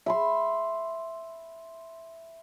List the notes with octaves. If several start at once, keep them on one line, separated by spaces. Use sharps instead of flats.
E5 B5 C6